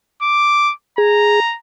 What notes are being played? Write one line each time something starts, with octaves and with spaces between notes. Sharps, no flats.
D6
G#4 A#5